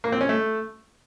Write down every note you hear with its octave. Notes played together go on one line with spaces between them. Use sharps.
A#3
C4
C#4
A3